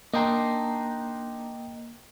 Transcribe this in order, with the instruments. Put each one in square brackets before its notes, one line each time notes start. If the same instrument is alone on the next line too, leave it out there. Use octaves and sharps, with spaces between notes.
[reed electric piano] A#3 A#5 [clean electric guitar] D4 D#4 C5 [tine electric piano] D#5 G5